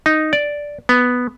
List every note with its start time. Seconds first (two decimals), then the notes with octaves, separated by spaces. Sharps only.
0.06 D#4
0.33 D5
0.89 B3